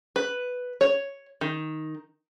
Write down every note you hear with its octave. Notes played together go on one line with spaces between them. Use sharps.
B4
C#5
D#3